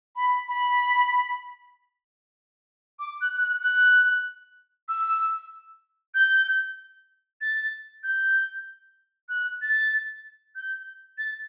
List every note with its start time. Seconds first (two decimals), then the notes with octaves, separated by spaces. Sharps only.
0.16 B5
0.48 B5
2.99 D6
3.21 F#6
3.41 F#6
3.63 F#6
4.88 E6
6.14 G6
7.41 A6
8.03 G6
9.29 F#6
9.62 A6
10.55 G6
11.18 A6